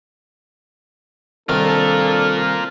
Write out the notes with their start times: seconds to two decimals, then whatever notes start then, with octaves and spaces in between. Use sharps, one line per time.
1.49 C2 D#3 D4 F4 A4 A#4